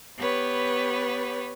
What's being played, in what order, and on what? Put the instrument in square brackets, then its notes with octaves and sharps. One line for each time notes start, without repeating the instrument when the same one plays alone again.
[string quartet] B3 G4 B4 C#5